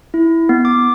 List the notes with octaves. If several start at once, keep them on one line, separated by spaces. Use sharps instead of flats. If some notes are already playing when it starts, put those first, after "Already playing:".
E4
B3
D6